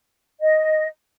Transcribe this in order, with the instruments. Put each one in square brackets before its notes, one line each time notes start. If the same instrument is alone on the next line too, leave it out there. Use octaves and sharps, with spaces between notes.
[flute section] D#5